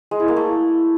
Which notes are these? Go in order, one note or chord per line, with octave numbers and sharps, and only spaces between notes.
G#3
E4
A#3
A3